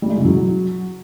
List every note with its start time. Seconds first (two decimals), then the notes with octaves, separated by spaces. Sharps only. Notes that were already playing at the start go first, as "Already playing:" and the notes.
0.02 G3
0.10 G#3
0.17 C#3
0.25 F#3